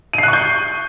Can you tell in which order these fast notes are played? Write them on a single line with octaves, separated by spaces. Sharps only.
D#7 C7 F#6 C#6 G6